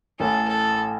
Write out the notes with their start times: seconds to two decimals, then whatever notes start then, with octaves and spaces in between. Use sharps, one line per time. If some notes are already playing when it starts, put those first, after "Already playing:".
0.20 A1 A2 E3 A4
0.48 A4